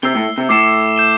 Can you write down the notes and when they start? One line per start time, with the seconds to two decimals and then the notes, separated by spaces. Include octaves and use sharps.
0.03 C3 E6 C7 G7
0.15 A2
0.38 C3
0.49 A2 D6 C7 E7 G7
0.96 G6 E7 G7